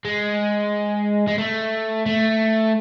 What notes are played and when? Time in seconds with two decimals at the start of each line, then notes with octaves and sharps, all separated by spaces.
0.05 G#3
1.28 G#3
1.38 A3
2.06 A3